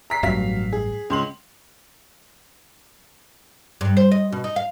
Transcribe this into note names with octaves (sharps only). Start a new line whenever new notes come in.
A#5 B6 C7
A1 G2 F#3 F5 B6
G#4
C#2 C6 F#7
G2
C5
D#5
B2
D#4
F5